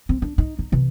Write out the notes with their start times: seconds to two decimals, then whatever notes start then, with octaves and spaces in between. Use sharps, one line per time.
0.09 C4
0.22 D4
0.38 D#4
0.59 D#4
0.72 C3 E3